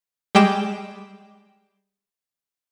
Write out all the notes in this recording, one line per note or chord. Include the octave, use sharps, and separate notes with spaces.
G3 G#3 G5 D6 E7